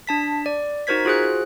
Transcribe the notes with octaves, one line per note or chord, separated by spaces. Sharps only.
D4 A5 B6
D5
D#4 F#4 A#4 C5 G#6 B6
F4 F#4 G#4 C5 F#6